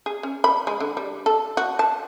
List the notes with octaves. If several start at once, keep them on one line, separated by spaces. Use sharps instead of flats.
G#4
C#4
B5
G#3
D3
G3
A4
F#4
A5